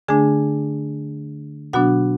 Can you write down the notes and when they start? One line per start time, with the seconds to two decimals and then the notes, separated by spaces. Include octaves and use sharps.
0.08 D3 A3 D4 G#4 G#5
1.73 B2 F#3 B3 D4 F#4 F#5